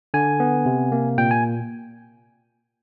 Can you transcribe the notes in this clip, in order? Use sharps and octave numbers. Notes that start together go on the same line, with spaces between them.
D3 G#5
B3
C3
A#3
A#2 G5
G#5